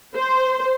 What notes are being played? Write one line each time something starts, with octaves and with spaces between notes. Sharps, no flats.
C5